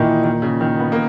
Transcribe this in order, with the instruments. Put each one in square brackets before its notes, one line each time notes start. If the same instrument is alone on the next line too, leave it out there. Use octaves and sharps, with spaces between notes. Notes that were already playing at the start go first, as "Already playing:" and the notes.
Already playing: [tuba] A#2 [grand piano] D#3 E3 D#4 E4
[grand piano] D#3
C#3
D#3
B3
A#3